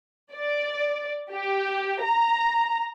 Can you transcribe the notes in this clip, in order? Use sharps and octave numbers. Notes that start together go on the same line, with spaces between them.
D5
G4
A#5